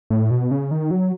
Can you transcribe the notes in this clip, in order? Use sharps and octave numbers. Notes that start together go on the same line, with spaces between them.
A2
B2
C#3
D#3
F#3